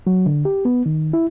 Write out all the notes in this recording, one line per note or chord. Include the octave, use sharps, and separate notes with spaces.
F#3
D3
G4
B3
D#3
E4